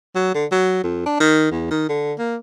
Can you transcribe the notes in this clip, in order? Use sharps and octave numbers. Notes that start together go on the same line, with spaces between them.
F#3
D3
F#3
F2
D4
D#3
E2
D#3
D3
A#3